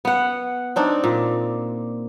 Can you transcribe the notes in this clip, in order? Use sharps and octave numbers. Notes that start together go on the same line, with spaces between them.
B3 F#5
C4 D4 D#4
A#2